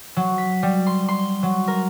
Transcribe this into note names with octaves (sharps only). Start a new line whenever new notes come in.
F#3
B6
G3
C6
C6
F#3
A#4